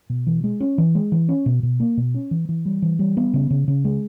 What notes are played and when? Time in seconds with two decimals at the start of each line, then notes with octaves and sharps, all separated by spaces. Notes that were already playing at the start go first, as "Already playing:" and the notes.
0.10 B2
0.27 E3
0.44 G#3
0.60 C#4
0.78 E3
0.95 G#3
1.12 E3
1.29 C#4
1.46 B2
1.63 B2
1.80 A#3
1.97 B2
2.14 C#4
2.31 E3
2.49 E3
2.66 G3
2.82 E3
2.99 G3
3.17 B3
3.34 C#3
3.50 C#3
3.68 C#3
3.85 G#3